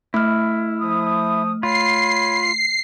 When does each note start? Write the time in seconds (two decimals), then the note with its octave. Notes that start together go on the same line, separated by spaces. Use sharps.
0.14 A3 E4 F6
0.81 F3 D#6
1.63 F4 C#5 B5 C7